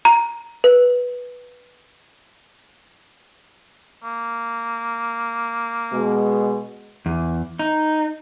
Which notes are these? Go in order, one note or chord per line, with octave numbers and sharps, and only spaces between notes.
A#5
B4
A#3
B2 G#3
E2
D#4